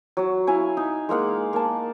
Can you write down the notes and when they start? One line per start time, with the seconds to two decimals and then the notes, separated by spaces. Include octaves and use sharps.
0.17 F#3 F#4
0.47 E4 F5 G#5
0.77 D#4
1.09 G#3 A#3 F5 F#5
1.53 A#3 A5